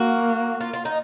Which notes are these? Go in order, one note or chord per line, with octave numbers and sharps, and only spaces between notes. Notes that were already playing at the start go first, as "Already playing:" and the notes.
Already playing: A#3 F#4
F4
F4
D#4